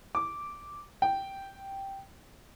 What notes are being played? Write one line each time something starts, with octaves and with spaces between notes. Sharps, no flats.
D6
G5